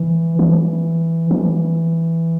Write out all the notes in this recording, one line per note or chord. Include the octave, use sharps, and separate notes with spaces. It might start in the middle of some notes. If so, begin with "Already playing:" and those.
Already playing: E3
E3
E3